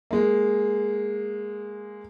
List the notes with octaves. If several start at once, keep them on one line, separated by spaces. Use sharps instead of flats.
G#3 A#3